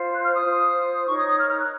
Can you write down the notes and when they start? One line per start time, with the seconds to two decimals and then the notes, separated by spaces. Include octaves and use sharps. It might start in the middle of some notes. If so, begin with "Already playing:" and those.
Already playing: F4 C5
0.13 F#6
0.24 F6
0.34 D#6
0.44 F4 C5
1.07 D#4 A#4 C#5 C#6
1.17 D#6
1.27 D#6
1.38 F6
1.48 F6
1.59 F#6